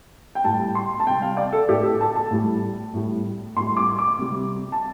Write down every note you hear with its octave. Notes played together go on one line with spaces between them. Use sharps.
G5
A2 G3 A5
C6
A5
C3 G3 G5
F5
D5
A4
A2 A3 G4
A4
A5
A5
A2 G3
A2 G3
A2 G3 C6
D6
D6
C3 G3
A5